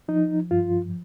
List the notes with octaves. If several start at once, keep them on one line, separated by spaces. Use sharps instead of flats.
F3 D#4
G2 F4